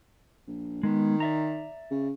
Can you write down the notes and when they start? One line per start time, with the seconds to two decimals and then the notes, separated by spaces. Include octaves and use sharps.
0.47 A#1
0.83 D#3 G#3 B3
1.20 D5 E5 A#5
1.91 C#3